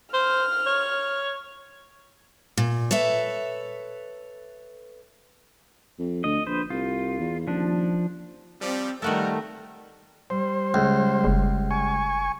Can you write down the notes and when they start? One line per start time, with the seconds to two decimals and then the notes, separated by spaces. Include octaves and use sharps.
0.13 C5 F6
0.66 C#5
2.57 A#2
2.91 A4 B4 C#5 E5
5.99 F2
6.24 D2 D#5
6.47 A#1 B4 C5
6.70 C2 F4
7.19 E2
7.47 D#1 F3 D4
8.61 F3 G3 C4
9.02 B2 D#3 F3 G3 A3 F#4 A4 A#4
10.30 G3 C5
10.74 C#2
11.24 F#1
11.71 G#5 C#6